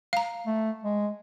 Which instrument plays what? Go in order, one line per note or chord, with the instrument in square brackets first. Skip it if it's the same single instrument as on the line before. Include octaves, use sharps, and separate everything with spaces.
[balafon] F5 A#5
[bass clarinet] A3
G#3